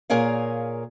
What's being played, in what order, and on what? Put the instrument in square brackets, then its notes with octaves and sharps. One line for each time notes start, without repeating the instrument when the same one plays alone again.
[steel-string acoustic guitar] A#2 G#4 A#4 C#5 F5